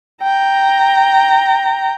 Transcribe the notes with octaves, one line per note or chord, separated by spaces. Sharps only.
G5 A#5